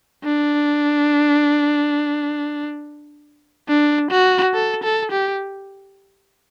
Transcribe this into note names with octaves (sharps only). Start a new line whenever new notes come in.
D4
D4
F#4
A4
A4
G4